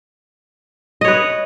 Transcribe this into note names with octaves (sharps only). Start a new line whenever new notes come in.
B4 C#5 D#5